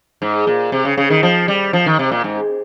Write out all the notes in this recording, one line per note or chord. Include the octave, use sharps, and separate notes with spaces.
G#2
A#2
C3
C#3
C#3
D#3
F3
G3
F3
D#3
C3
A#2
G#2